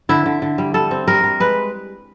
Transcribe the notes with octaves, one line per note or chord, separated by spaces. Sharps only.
D3 E4
D3
D3
G3
G3 A4
C4
G3 A#4
G3
G#3 B4